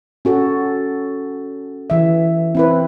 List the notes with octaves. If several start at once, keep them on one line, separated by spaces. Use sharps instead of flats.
C#4 F#4 A4
E3 E5
C4 E4 B4